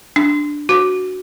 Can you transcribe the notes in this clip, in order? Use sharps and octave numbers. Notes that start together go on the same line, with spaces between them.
D4
F#4